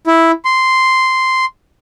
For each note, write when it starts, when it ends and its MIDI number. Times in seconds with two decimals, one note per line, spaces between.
0.07 0.31 64
0.45 1.45 84